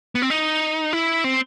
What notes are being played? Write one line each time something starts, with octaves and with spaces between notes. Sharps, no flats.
B3
C4
D#4
E4
C4